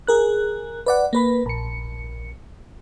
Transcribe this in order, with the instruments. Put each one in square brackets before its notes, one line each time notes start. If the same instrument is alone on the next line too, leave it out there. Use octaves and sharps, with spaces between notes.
[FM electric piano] G#4 A#4 F#6
B4 D5 F#5
A#3 B4 B5
A#1 C#7